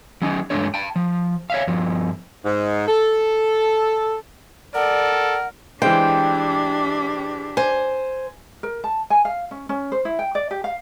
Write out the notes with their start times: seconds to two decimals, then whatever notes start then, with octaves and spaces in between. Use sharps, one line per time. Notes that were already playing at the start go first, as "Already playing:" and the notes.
0.22 F#3 C#4 D#4
0.50 G2 G#3 A3 D4 C#5
0.74 G5 A5
0.96 F3
1.50 C#5 E5 F5
1.67 G2 F3
2.45 G#2
2.88 A4
4.75 A4 A#4 D5 F#5
5.82 E3 G#3 D4 G4 C5 G5
7.57 C5 G#5
8.63 A#4
8.84 A5
9.10 G#5
9.25 F5
9.51 C#4
9.69 C#4
9.92 C5
10.05 E4
10.19 G5
10.35 D5
10.51 G4
10.64 F5